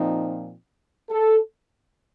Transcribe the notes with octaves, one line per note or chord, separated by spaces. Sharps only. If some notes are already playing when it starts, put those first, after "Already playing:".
Already playing: A#2 F3 C4 D#4
A4